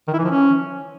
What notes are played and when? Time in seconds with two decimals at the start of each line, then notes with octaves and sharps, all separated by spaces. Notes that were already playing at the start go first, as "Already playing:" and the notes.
0.08 D#3
0.13 E4
0.19 E3
0.25 F3
0.30 C#4